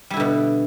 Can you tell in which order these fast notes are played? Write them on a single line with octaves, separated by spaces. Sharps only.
G3 E4 D3 B2